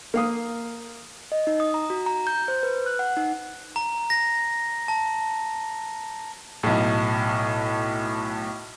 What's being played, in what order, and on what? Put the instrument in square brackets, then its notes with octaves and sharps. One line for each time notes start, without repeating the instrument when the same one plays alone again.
[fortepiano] A#3 F5 D#6
[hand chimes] D#5
D#4
D#6
A#5
F#4
A#5
G6
C5
B4
F#6
F#5
D#4
[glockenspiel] A#5
A#6
A5
[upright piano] B1 A2